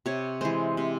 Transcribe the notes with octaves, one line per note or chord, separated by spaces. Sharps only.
C3 C#5
E3 G#3 C5
C3